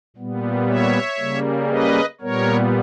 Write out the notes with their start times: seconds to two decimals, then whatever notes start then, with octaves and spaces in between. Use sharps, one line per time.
0.17 A#2 G3 B3
0.67 C#5 E5
1.18 C#3 G3 A#3
1.69 B4 D#5
2.21 A#2 G3 B3 A#4 C#5